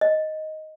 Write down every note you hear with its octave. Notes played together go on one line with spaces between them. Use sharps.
D#5